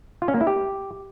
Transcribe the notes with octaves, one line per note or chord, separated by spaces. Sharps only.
F4
C#4
A#3
E4
G4